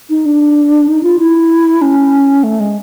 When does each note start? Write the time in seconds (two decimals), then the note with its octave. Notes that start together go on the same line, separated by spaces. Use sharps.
0.10 D#4
0.26 D4
0.88 D#4
1.03 F4
1.19 E4
1.82 C#4
2.44 A3
2.60 G#3